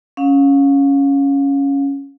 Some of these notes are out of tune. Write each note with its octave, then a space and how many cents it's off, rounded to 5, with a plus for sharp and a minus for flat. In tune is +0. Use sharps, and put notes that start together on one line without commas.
C#4 +0 F5 +30